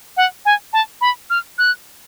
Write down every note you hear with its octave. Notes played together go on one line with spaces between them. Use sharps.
F#5
G#5
A5
B5
F6
F#6